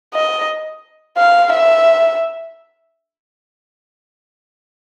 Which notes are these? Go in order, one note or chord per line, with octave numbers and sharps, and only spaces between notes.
D#5
F5
E5